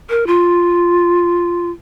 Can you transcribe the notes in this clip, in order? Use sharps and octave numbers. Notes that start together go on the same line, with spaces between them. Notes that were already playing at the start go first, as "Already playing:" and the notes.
A#4
F4